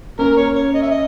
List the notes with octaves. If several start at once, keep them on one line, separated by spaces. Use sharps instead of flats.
A#3 C#4 A#4
C#5
C#5
D#5
E5
D#5